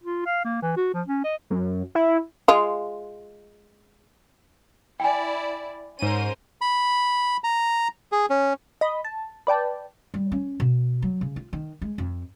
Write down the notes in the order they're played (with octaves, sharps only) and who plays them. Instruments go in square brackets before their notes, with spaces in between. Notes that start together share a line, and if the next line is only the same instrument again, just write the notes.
[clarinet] F4
F5
A#3
E3
F#4
F3
C#4
D#5
[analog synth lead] F#2
E4
[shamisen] G#3 F4
[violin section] E4 D5 [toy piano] G5 G#5
[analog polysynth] G#2 D#7 [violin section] C#4 A#4 C5
[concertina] B5
A#5
G#4
C#4
[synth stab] D#5 B5
A5
B4 D5 G5 A5
[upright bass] G3
C#4
B2
F#3
C#3
F4
D#3
G#3
F2